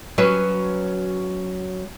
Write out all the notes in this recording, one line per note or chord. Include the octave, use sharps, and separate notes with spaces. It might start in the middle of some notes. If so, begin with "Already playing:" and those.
F#3 C#4 B4